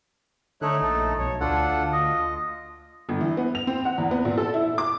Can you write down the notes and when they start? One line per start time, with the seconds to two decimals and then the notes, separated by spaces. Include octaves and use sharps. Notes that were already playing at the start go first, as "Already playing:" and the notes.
0.62 D3 A3 D#4 C#5 E5 F#6
0.82 A#1 A4
1.19 B1 C#5
1.41 D2 D4 F4 A4 F#5
1.92 D#5
3.09 G1
3.21 E3
3.37 B3
3.55 F7
3.67 C4
3.85 F#5
3.98 E2
4.11 B3
4.25 A#2
4.38 A4
4.54 E4
4.78 D6